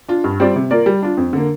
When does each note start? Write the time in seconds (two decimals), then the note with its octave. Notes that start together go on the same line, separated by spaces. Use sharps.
0.08 D4 F4
0.24 G2
0.40 G3 C4 F4 D5
0.56 C3
0.71 A#3 F4 A#4 D5
0.86 G3
1.02 D4 F4
1.17 F2
1.33 D3 A#3